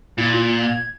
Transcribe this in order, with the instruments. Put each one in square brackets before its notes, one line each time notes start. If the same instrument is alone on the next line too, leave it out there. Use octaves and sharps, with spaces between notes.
[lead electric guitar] A#2 [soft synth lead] E4
[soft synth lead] F4
G#6